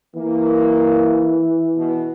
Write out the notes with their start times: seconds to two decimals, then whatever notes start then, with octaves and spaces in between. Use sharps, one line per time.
0.16 E3 A#3
1.76 B2